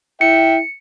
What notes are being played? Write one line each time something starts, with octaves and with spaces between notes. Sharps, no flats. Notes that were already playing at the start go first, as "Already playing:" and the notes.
E4 E5 G5 C#7